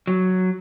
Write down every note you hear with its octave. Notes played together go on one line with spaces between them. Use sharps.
F#3